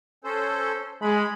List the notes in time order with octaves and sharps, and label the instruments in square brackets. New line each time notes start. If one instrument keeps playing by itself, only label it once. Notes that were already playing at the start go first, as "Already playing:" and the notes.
[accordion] C#4 A4 C5
[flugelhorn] G#3 [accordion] B5